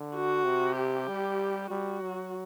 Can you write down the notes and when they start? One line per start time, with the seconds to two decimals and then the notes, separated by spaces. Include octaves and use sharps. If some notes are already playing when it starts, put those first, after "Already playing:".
Already playing: D3
0.15 F#4
0.46 C3
0.77 G4
1.08 G3
1.70 G3 F#4
2.01 F#3